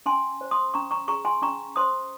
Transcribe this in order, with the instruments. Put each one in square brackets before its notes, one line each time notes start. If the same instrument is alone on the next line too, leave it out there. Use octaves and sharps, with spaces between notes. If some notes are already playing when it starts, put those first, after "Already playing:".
[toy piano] C#4 G#5 C6
C5
C6 D#6
C#4 A#5 C#6
A#5 C#6
G#4 A#5 C#6
G#5 C6
C#4 A#5 C#6
C5 C6 D#6